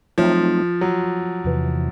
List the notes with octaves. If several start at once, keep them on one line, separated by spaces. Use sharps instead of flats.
F3 F#3 A3 C4 D#4
F#3
E2 C3 E3